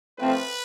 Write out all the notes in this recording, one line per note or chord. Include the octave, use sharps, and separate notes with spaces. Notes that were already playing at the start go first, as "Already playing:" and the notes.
F3 A3 C4 B4